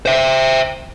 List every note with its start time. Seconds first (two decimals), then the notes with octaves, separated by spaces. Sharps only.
0.06 C5 E5